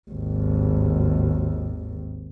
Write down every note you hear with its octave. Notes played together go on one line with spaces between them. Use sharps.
G#1 D#2